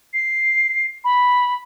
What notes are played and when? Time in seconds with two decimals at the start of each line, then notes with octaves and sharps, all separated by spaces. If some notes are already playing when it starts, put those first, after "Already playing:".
0.13 C7
1.04 B5